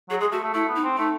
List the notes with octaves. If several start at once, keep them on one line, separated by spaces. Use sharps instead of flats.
F#3 G#4
G#3 G#4
A3 F#4
A3
A3 E4
B3
D#4
C4
A3 D#4